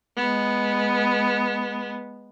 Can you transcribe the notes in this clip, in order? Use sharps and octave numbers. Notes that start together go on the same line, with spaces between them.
G#3 B3